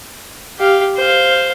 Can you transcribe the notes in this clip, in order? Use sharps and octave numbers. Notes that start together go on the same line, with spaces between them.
G4 F5
C5 F5